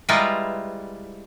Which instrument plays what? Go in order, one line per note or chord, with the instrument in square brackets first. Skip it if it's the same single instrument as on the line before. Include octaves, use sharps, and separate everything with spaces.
[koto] G3 G#3 E4 F4 A#4 B4